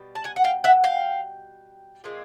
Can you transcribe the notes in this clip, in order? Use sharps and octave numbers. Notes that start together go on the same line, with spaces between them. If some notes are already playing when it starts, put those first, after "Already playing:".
Already playing: B2 G3
A5
F#5 G#5
F#5
F5 G5
E5 F#5
F5 G5
A#2 F3 G#3 C4